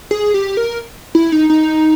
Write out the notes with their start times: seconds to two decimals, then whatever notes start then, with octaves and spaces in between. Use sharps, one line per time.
0.11 G#4
0.34 G4
0.57 A#4
1.15 E4
1.32 D#4
1.50 D#4